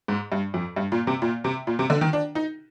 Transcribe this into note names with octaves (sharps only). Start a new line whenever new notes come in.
G#2
G2
F2
G2
A#2
C3
A#2
C3
A#2
C3
D3
D#3
D4
D#4